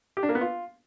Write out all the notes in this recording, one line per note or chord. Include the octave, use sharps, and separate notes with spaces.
G4
D4
A#3
B3
F4